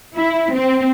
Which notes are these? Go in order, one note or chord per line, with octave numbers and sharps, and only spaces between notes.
E4
C4